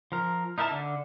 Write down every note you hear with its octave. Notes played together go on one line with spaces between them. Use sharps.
F3 A#4
D#4 E4 A#4 E5 A5
D3